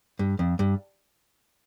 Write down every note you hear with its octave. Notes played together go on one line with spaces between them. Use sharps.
G2
F2
G2